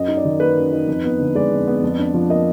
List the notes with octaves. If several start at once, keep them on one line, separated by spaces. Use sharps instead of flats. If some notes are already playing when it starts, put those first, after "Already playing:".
Already playing: F#2 D#5
D#4
D5
D#3
A#3 B4
F#2
D#4
F2
B3
D3
G#3 D5
F2
B3
F2
D4
F3
A#3 D#5